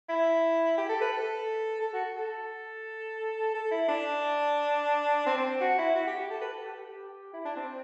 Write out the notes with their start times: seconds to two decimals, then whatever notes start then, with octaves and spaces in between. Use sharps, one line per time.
0.09 E4
0.78 G4
0.89 A4
1.01 B4
1.13 A4
1.81 A4
1.93 F#4
2.16 A4
3.54 A4
3.71 E4
3.88 D4
5.26 C4
5.38 C4
5.61 F#4
5.78 E4
5.95 F#4
6.07 G4
6.19 G4
6.30 A4
6.41 B4
6.53 A4
6.64 G4
7.33 E4
7.45 D4
7.56 C4